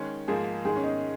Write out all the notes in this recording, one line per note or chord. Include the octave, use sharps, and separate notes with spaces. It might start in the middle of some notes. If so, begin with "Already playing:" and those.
Already playing: D#3 G#3 C#4
G#2 F3 A#3 D#4 G#4
G#2 D#3 G#3 G#4
C#4
D#4